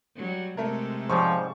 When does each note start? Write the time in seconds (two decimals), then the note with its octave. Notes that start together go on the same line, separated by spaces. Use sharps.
0.16 F#3 G3
0.57 C3 G#3 A3 A4 A#4
1.10 G#2 C#3 F3 G3 C#6